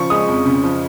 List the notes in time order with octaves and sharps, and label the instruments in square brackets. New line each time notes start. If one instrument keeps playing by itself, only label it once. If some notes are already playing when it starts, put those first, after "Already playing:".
Already playing: [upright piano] C#3 F3 C#6
G#3 D#6
F2
C#3
F3